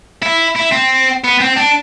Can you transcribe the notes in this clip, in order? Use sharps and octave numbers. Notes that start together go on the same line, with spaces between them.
E4
E4
C4
B3
C4
D4